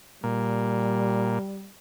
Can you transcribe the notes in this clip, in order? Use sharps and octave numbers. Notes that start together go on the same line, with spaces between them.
A#2 G3